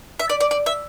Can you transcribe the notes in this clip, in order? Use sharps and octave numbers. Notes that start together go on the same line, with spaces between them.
E5
D5
D5
D5
E5